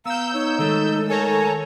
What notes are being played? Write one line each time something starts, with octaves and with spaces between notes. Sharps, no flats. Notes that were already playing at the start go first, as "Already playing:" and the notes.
B3 F5 A#5 E6 G6
D#4 C#5
D#3 G#3 A3 A4
A4 A#4 C#5 G#5 A#5